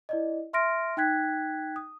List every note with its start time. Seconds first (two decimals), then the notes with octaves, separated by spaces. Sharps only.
0.09 E4 D5 D#5
0.53 E5 C6 F6 A#6 D7
0.97 D#4 G5 F#6 G#6 B6
1.76 D#6